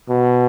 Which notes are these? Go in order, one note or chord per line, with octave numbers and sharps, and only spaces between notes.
B2